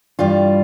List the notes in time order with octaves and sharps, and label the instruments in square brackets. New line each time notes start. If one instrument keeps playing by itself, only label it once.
[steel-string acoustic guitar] G2 E3 G3 F4